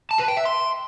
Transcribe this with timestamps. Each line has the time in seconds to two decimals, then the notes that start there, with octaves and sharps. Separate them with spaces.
0.11 A5
0.19 B4
0.28 G5
0.37 E5
0.45 C6